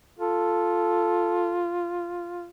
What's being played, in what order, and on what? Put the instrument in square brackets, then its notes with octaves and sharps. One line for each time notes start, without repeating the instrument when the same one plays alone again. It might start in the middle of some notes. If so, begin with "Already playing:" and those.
[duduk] F4 [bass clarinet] A4